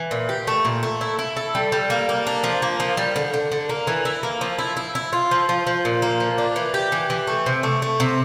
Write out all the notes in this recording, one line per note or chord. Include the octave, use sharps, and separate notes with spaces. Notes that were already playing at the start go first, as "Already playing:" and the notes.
Already playing: E3
A#2
G4
A3
A#2
A3
E4
E4
A4
G3
G3
A#3
A#3
D4
F3
A#3
F3
G3
D3
D3
D3
A#3
E3
E4
A#3
F3
E4
E4
E4
F4
F3
F3
F3
A#2
A#3
F3
D4
E3
G4
E3
E3
A3
C3
A3
A3
C3